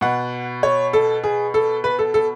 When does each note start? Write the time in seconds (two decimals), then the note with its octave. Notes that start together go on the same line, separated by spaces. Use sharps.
0.01 B2 F#5
0.63 C#5
0.93 A4
1.24 G#4
1.54 A4
1.84 B4
1.99 A4
2.14 A4